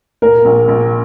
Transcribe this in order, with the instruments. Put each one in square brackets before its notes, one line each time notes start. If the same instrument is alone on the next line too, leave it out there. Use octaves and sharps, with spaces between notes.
[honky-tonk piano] A#2 [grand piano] A#4
[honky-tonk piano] A#1
A#1